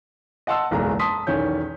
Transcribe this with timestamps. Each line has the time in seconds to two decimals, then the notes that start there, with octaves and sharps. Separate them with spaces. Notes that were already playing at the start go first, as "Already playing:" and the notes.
0.47 D#5 F#5 A5 C6 E6
0.71 F#1 B1 E2 G#3 A#5
0.99 A5 C6 D#6 B6
1.27 B1 E2 D#3 C#4 G6